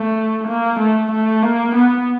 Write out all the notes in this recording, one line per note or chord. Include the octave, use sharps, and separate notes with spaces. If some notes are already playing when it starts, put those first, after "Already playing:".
Already playing: A3
A#3
A3
A3
A#3
B3